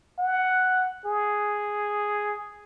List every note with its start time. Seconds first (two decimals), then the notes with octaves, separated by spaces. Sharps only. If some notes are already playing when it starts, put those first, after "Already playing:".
0.19 F#5
1.05 G#4